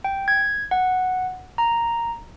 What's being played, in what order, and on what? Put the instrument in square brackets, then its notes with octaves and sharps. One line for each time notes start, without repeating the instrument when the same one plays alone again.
[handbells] G5
G#6
F#5
A#5